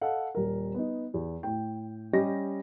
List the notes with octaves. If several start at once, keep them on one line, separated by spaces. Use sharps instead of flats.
A4 D#5 F5 F#5
D#1 A#4
B3 D#4
E2
A2 G5
G3 C#4 G4 D#5 A#6